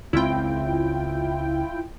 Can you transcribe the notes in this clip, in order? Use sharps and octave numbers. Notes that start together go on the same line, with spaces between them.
C#2 C4 E4 F4 G5